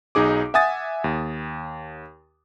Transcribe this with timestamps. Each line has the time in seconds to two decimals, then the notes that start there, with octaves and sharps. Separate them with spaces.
0.15 B1 D#4 G#4 D6
0.54 E5 F#5 G#5 D#6 A6
1.04 D#2